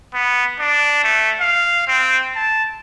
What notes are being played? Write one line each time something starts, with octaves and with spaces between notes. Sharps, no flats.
B3
D4
A3
F5
C4
A5